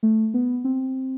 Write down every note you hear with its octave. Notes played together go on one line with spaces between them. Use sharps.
A3
B3
C4